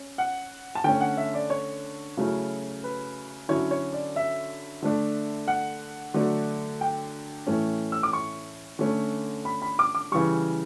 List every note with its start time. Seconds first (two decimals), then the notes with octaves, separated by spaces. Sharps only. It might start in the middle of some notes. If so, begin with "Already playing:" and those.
Already playing: C#4
0.18 F#5
0.75 A5
0.84 D3 A3 C#4 G5
1.01 F#5
1.17 E5
1.34 D5
1.50 C#5
2.17 C#3 F#3 A3 C#4 E4
2.84 B4
3.49 D3 F#3 C#4 E4 C#5
3.71 C#5
3.93 D5
4.16 E5
4.82 D3 A3 D4
5.48 F#5
6.14 D3 F#3 A3 D4
6.81 G5
7.47 A2 E3 A3 C#4
7.92 E6
8.03 D6
8.13 C#6
8.79 D3 A3 C#4
9.45 B5
9.62 B5
9.79 D6
9.95 D6
10.11 C#3 E3 G3 C#6